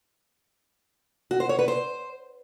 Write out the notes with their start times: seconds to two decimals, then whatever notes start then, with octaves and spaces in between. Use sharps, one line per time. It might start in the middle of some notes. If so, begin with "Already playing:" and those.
1.31 F#4
1.40 C5
1.49 C#5
1.59 B4
1.68 C5